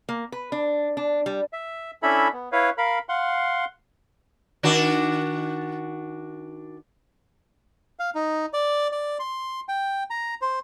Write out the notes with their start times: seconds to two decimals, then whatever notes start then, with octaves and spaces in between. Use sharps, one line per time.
0.09 A#3
0.32 B4
0.52 D4
0.97 D4
1.26 G3
1.53 E5
2.03 C#4 D4 E4 A4 E5 B5
2.33 B3
2.52 E4 B4 C#5 F5
2.78 A#4 F5 B5
3.09 F5 F#5 C6
4.63 D#3 D4 F#4
7.99 F5
8.15 D#4
8.53 D5
8.92 D5
9.19 C6
9.69 G5
10.10 A#5
10.41 C5